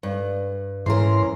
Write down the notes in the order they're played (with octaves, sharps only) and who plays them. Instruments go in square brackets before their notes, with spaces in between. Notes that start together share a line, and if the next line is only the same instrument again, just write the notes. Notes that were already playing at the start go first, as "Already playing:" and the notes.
[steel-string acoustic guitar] G2
[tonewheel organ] G#2 C6 [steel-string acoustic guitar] E3 C#4 A#4